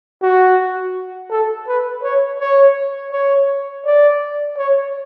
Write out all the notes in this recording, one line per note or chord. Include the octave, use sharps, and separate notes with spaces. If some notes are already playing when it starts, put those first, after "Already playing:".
F#4
A4
B4
C#5
C#5
C#5
D5
C#5